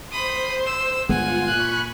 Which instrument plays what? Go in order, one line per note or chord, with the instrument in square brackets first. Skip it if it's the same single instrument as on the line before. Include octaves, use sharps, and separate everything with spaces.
[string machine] C5 [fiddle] B5 D#6 [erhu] C6
[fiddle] E6
[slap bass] G1 G#3 B3 [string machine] F4 [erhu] F#5 [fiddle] G#5
[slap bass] A#2 [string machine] B5 C#6 [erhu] F#6